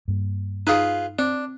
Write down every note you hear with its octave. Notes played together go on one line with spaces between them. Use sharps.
G2 A#3
D#4 F4 G#4 B4 D#6
C4 D4